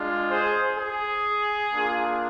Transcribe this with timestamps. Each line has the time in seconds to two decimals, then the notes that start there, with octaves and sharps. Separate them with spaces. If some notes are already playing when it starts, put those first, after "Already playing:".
Already playing: G#3 D4 F4
0.29 G#4 C5
0.78 G#4
1.72 A#3 D4 F4